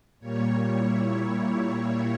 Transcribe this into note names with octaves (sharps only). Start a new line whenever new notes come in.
A#2 G3 A#3 C#5
E4